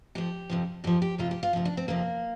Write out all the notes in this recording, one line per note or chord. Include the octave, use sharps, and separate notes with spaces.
F2 F3 G4
F2 C3 F3
F2 F3 G4
G4
F2 C3 F3 F4
G4
F4
D2 C3 F3
D4
C4
F2 C3 F3 A#3